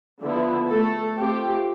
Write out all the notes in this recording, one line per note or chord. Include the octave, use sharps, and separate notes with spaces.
D3 F3 B3 E4
A3 A4
A3 C4 F4 G4